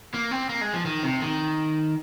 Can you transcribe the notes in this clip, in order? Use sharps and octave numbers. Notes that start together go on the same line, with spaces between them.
A#3
C4
A#3
G#3
F3
D#3
C3
D#3